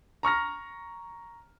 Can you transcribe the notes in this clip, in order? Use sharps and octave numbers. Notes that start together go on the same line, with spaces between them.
A#5 C#6 F6 A#6